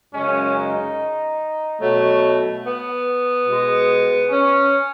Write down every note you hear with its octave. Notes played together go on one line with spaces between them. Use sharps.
F#2 C#3 G#3 C#4
D#4
B2 F#3 A3
B3
B2 G#3
C#4